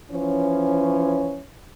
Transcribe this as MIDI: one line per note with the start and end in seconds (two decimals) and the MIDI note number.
0.12 1.41 52
0.12 1.41 53
0.12 1.41 61